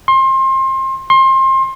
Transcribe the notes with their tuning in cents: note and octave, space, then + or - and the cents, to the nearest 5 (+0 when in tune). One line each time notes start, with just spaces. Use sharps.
C6 +30
C6 +30